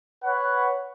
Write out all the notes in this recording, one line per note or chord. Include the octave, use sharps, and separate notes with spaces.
B4 C#5 F#5